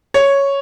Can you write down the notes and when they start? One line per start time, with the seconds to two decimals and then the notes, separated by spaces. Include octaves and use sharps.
0.14 C#5